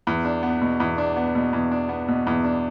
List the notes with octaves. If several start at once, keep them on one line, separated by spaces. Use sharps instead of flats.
E2
D4
B3
B2
E2
D4
B3
B2
E2
D4
B3
B2
E2
D4